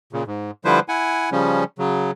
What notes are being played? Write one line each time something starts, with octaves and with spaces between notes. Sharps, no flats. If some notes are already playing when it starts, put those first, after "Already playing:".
A#2 C#3
G#2
D3 F3 G3 E4 B4 C5
E4 F#5 G#5
C#3 F3 G3 C#4
C#3 F#3